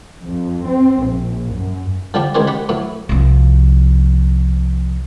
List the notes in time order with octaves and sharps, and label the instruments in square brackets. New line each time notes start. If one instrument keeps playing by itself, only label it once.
[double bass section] F2
C4
A#1
F#2
[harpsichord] D3 F3 G3 D4 G4
C#2 D#3 B3 G#4 C5 D5
G4 F#5 B5
A2 F#3 B3
[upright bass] C2 F3